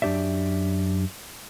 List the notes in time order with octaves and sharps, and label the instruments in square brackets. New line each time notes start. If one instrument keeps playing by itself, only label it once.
[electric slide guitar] F#2 D4 G4 D5 E5